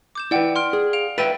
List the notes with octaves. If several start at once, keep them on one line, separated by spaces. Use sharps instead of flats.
D6 G6 E7
E4 B4 D5 F#5 G5
C6 F6 D7
G#4
F5 D7 F7
B4 E5 G5 A6 D7 D#7